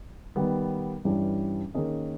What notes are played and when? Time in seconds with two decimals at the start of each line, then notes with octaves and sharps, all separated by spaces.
0.36 D#3 G3 B3
1.05 G2 E3 G3 C#4
1.75 D#3 A#3 C#4 G#4 D#5